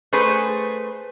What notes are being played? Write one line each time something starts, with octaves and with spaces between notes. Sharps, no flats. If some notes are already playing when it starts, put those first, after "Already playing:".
A3 G#4 B4 C5